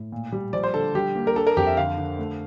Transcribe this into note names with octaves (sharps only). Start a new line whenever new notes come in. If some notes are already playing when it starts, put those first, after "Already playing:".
Already playing: A2
A#2
G3
F3 D5
C5
D3 A4
G3 G4
A#3
A#4
D4 A4
A#4
F2 G4
E5
D3 F5
D3
A3